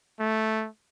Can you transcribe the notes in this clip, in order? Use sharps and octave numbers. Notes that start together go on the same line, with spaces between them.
A3